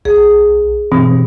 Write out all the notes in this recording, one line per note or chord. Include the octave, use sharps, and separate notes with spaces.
B1 G#4
G2 B2 E3 C4